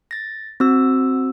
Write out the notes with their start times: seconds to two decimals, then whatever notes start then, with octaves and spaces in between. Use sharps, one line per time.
0.11 A6 A#6
0.60 C4 F#4 E6